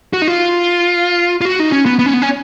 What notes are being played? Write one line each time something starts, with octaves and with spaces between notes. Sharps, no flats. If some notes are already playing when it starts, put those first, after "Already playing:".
F#4
D#4
F4
F4
F#4
D#4
C#4
B3
B3
C#4
B3
C#4